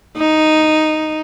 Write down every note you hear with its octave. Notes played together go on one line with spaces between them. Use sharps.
D#4